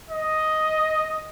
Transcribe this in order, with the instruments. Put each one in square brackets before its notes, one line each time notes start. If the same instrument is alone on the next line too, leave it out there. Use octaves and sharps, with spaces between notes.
[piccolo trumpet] D#5